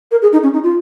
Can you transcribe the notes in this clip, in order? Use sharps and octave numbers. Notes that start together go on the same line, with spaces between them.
A#4
G#4
D#4
C#4
D#4
F4